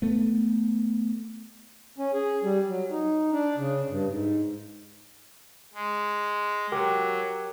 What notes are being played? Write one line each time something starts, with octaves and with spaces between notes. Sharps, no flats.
A3 B3
C#4
G#4
G3
F#3
D#4
D4
C#3
G2
G#2
G#3
F#3 G4 A#4